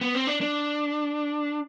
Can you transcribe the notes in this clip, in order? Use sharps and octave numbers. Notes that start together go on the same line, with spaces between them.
B3
C4
D4
D4